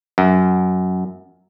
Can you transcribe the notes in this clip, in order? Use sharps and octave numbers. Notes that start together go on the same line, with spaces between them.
F#2